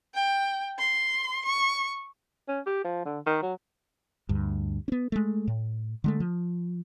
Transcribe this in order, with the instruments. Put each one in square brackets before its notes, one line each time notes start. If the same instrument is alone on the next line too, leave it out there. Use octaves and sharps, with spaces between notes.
[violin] G5
C6
C#6
[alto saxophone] C#4
G4
F3
D3
D#3
F#3
[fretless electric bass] D2 G2
B3 C#4
G#3 A3
A2
D3 G#3 A3
F3